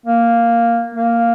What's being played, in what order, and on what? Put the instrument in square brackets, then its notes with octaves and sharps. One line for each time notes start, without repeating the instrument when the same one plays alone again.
[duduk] A#3
A#3